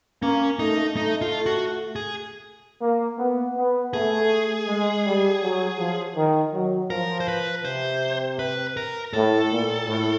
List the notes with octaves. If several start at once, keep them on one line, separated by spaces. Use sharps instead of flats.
A#3 C#4
A3 D#4
D#4
F4
F#4
G#4
A#3
B3
B3
A3 G#4
G#3
G3
F#3
F3
D#3
F#3
F3 A#4
C5
B4
C3 C5
B4
A#4
A2 A4
A#2
A2